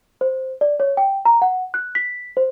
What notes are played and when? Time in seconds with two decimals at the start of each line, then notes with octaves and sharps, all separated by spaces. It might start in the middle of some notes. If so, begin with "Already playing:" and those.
0.21 C5
0.61 D5
0.80 C#5
0.97 G5
1.25 A#5
1.42 F#5
1.74 F#6
1.95 B6
2.37 C5